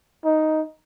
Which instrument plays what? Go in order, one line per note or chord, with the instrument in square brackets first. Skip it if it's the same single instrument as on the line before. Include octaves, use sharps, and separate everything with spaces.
[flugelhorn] D#4